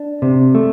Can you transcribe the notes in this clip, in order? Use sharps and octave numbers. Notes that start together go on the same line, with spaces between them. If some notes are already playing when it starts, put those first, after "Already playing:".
Already playing: D4
C3
A3